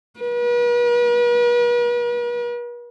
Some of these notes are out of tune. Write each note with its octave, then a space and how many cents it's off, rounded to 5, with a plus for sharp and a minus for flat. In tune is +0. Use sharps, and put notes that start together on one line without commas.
B4 -45